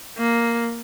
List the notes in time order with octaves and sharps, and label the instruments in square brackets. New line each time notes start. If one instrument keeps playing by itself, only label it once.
[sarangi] A#3